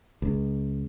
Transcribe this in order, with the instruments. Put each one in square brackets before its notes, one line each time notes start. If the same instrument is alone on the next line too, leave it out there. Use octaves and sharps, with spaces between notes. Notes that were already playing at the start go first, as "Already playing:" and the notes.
[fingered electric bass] C#2